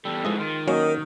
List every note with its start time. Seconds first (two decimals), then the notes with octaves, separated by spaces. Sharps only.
0.05 E2 G3 A4
0.25 G#2 E3 F3 G#3 D#5
0.39 D#3 F4
0.68 F#3 A#3 C#4 A#4 D#5